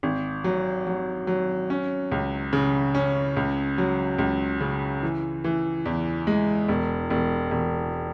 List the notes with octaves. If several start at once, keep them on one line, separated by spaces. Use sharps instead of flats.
G#1
F#3
F#3
F#3
C#4
C#2
C#3
C#4
C#2
F#3
C#2
C#3
E3
E3
E2
G#3
E1
E1
E1